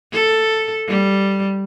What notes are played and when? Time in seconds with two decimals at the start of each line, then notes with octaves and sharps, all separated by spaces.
0.13 A4
0.88 G3